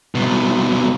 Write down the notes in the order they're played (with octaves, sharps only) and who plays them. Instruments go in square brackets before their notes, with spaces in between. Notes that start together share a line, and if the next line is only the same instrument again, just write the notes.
[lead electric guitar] C2 B2